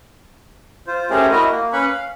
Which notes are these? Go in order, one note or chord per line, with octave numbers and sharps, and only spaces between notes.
F4 C5
A3 C#4 G4 G#4 A#4 C5
E4 F#4 A#4 D#5
A#3
C#4 B4 B5 C#6
F5